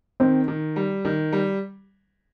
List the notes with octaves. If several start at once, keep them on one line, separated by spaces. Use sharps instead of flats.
D#3 C4
D#3
G3
D#3
G3